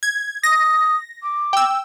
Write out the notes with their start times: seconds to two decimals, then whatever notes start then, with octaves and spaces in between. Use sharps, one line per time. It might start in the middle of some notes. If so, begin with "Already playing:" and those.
0.03 G#6
0.43 D#6 A#6
1.22 D6
1.53 G5 E6